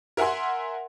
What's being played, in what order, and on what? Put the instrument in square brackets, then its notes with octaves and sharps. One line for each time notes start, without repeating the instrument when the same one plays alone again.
[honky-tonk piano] A#4 E5 F#5 G#5 C6